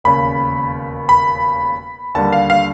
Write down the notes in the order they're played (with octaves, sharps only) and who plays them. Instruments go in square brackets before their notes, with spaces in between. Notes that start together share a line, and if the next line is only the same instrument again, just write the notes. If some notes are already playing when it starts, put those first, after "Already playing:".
[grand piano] E1 D#2 C#3 B5
B5
D#2 D3 G3 A5
F5
F5